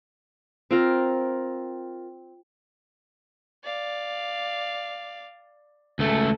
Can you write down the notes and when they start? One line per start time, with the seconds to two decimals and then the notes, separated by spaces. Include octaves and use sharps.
0.71 C4 F4 A#4
3.64 D5 F5
5.99 C#2 A3 A4